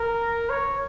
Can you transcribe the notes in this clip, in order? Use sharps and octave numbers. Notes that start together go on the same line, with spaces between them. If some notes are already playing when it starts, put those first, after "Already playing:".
Already playing: A#4
C#5